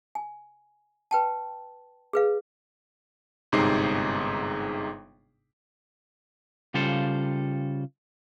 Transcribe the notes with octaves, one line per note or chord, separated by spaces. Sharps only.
G#5
B4 G5 A5
G#4 B4 F5
G1 G#2 C3 D#4 G#4 C7
C#3 G3 F4 A4 C5